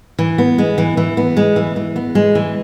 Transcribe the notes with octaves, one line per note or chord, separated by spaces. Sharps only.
E3
B3
G#3
E3
E3
B3
G#3
E3
E3
B3
G#3
E3